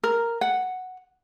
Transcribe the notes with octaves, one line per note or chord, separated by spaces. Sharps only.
A#4
F#5